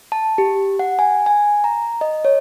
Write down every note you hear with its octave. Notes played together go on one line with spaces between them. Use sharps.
A5
G4
F#5
G#5
G#5
A#5
D#5
C#5